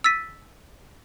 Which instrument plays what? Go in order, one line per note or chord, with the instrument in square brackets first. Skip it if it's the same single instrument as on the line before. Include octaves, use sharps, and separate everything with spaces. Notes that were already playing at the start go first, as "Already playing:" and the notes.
[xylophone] E6 A6 B6 D#7